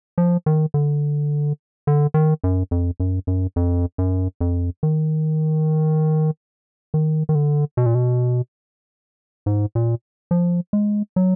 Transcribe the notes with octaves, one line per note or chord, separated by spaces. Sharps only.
F3
D#3
D3
D3
D#3
F#2
F2
F#2
F#2
F2
F#2
F2
D#3
D#3
D#3
D3
B2
A#2
B2
G#2
A#2
F3
G#3
F#3